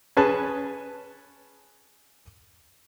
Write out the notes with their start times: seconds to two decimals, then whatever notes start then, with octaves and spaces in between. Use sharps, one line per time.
0.17 C#4 G#4 B4 A5